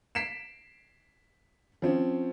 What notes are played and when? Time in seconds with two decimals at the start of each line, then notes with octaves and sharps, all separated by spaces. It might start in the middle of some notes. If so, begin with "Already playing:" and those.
0.15 B6 C7 D7 E7
1.82 F3 C4 C#4